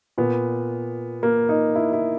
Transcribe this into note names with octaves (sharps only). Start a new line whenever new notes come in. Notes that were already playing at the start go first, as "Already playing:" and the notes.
A#2 B3
A#3
D#4
E4
E4